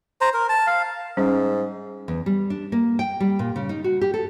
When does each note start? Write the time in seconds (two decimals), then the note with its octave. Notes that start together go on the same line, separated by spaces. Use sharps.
0.21 C5 A#5
0.33 A#4
0.49 A5
0.67 F5
1.17 G#2 G3 C#4
2.08 E2
2.26 G3
2.50 D4
2.72 A#3
2.99 G5
3.20 G3
3.39 A#2
3.56 C#3
3.69 D#4
3.84 F#4
4.01 G4
4.14 A4